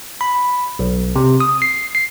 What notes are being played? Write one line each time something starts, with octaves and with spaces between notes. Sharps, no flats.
B5
B1
C3
D#6
C7
C7